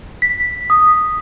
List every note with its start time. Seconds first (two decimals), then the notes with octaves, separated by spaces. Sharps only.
0.22 B6
0.70 D#6